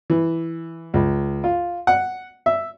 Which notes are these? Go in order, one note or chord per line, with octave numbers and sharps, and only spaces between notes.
E3
C#2
F4
F#5
E5